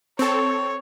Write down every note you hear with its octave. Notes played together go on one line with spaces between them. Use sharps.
C4 A4 C#5